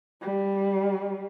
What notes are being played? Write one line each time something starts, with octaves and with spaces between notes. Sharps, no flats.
G3